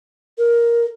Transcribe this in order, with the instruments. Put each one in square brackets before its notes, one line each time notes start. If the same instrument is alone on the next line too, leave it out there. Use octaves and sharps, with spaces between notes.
[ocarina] A#4